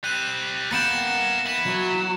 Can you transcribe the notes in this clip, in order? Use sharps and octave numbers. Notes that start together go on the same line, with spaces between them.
G3 C4 F#6 D#7
A#3 B3 A#4 F#5 G5 A6 C#7 E7
E4 B4 E7
F#3